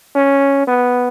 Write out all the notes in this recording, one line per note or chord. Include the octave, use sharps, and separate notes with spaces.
C#4
B3